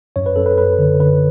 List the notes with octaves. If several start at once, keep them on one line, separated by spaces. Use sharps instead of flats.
F#2 C#5
B4
F#2 A4
B4
F#2 B4
D3
D3 B4